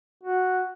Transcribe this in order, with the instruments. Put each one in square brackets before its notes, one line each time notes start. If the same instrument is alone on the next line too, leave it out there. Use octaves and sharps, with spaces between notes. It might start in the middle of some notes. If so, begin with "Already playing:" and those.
[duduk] F#4